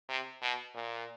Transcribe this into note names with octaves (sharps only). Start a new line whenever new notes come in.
C3
B2
A#2